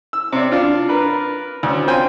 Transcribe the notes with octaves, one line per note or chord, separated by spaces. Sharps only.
E6
C3 D5
D4 F4
A#4 B4
D2 C#4
C4 F4 C5 G5 G#5